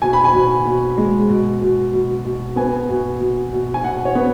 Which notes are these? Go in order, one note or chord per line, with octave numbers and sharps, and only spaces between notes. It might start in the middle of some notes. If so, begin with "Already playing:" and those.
B2 G#5
B5
G#5
B2
B2
G#3
B2
B2
B2
B2
B3 G#5
B2
B2
B2
G#5
B2 F#5
C#5
B3